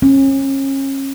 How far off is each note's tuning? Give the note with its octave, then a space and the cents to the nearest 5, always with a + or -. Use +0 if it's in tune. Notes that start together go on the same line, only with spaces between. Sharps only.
C#4 -35